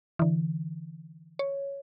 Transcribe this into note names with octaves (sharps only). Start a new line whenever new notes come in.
D3 E3
C#5